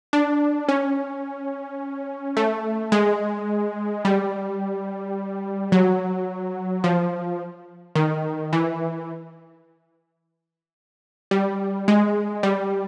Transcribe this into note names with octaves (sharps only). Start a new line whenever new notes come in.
D4
C#4
A3
G#3
G3
F#3
F3
D#3
E3
G3
G#3
G3